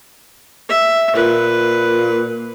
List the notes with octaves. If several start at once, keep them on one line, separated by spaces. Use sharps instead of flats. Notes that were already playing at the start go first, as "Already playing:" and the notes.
E5
A#2 B4